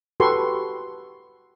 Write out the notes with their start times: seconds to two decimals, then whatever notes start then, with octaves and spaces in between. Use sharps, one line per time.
0.20 F#4 G4 A4 B4 C6 C#6